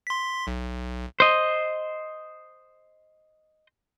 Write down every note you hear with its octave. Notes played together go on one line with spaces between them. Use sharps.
C6 B6
B1
C5 D#5